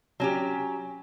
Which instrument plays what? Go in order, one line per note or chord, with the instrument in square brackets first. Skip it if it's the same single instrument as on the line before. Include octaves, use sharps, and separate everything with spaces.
[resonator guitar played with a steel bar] F#3 C#4 G4